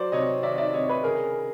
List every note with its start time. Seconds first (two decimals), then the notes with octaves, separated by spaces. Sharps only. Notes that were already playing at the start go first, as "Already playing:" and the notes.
Already playing: F#3 C5 D5
0.12 C3 C#5 D#5
0.43 D#3 D5 E5
0.58 D5 E5
0.73 C3 C#5 D#5
0.89 B4 C#5
1.03 C#3 G#4 A#4